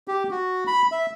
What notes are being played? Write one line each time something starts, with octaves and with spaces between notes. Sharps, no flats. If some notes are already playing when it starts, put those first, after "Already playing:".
G4
F#4
B5
E5